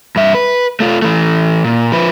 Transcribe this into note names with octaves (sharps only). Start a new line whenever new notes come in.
G2 E5
B4
A3 F4
E3 A3
A#2
F3 B4